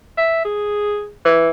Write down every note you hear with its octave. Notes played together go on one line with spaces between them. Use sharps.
E5
G#4
E3